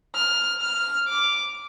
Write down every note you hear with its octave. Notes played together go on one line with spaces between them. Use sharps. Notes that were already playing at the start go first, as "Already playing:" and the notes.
F6
F6
D6